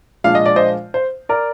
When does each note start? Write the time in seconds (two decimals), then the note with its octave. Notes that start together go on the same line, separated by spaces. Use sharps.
0.24 A#2 F3 G#3 D4 F4 F5
0.35 D#5
0.46 D5
0.56 C5 D#5
0.94 C5
1.29 A#4 D5